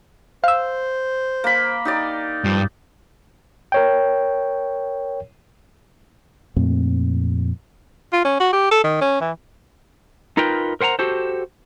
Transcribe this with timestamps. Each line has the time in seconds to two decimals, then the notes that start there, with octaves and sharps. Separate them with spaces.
0.44 C5 F5 E6
1.44 A#3 B5
1.85 D#4 G4 D5
2.44 G2 F3
3.72 A#4 C#5 G5
6.56 F2 A#2 A3 C4
8.13 F4
8.25 C#4
8.40 F#4
8.53 G4
8.71 A4
8.84 D#3
9.01 C#4
9.21 E3
10.37 D#4 F4 A#4 B4 G5
10.81 A#4 C5 F#5 G5 A#5
10.99 F#4 G4 A4 C5